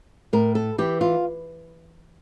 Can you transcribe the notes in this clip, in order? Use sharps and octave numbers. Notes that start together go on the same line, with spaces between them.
A2 A#4
A4
E3 G4
F4